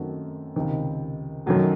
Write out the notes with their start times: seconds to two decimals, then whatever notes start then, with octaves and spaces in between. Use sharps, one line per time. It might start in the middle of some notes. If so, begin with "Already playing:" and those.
Already playing: F#2 D#3 A3 C4 F#4
0.56 C#2 C3 D#3
1.46 F#2 D#3 F#3 A3